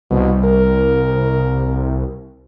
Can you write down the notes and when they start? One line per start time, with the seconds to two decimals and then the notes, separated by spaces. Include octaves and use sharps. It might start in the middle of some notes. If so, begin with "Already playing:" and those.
0.11 C2 B2
0.45 A#4